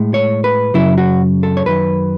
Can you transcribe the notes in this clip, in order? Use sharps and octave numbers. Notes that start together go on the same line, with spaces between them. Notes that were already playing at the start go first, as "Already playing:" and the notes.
Already playing: A2 G#3
C#5
B4
F#2 C#3 F#3 E4
F#4
A4
C#5
F#2 D#3 F#3 B4